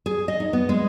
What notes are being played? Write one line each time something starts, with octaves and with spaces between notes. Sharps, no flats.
G#4
D#5
D#4
B3
G#3